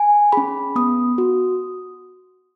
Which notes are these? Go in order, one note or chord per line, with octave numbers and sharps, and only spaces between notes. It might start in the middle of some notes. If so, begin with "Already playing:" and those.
Already playing: G#5
C#4 G#4 B5
B3 D#6
F#4